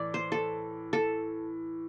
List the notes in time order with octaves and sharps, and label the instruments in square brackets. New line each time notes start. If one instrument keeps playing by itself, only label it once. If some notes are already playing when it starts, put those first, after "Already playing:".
Already playing: [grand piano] A2 E3 [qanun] D5
[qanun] C5
A4
A4